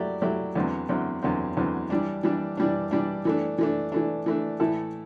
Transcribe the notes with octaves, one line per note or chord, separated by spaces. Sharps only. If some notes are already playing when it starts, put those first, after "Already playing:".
Already playing: F#3 A3 E4 G4 D5
F#3 A3 E4 G4 D5
E2 D3 F#3 C4
E2 D3 F#3 C4
E2 D3 F#3 C4
E2 D3 F#3 C4
E3 G3 D4
E3 G3 D4
E3 G3 D4
E3 G3 D4
E3 A3 D4
E3 A3 D4
E3 A3 D4
E3 A3 D4
A2 E3 A3 E4 A4